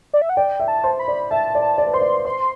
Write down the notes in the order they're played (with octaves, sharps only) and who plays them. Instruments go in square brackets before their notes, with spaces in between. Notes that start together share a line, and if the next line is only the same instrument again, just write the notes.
[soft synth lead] D5
E5
F#5
[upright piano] D5 [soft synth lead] G5
[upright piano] E5
[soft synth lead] A5
[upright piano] C5
[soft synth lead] B5
[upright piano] D5
[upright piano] E5 [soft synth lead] A5
[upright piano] D5
[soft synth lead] A5
[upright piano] D5
B4
[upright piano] C5 [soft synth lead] C6
[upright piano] D5
[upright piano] C5 [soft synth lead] C6